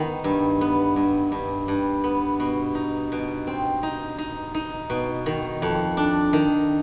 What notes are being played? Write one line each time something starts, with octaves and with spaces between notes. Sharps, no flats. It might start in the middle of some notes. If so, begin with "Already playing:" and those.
Already playing: D#3 B3
G2
B3
G2
G2
G2
B3
B2
D#4
B2
C4
D#4
D#4
D#4
B2
D#3
F2
D4
D#3